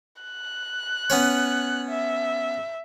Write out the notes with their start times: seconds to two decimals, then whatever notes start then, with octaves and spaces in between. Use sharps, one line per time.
0.22 F#6
1.10 B3 C#4 C#5
1.89 E5